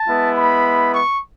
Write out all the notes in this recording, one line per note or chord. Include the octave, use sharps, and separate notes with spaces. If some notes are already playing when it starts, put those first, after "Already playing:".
Already playing: A5
G#3 B3 E4
B5
C#6